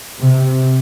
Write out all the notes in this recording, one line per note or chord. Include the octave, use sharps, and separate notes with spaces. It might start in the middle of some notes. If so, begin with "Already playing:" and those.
C3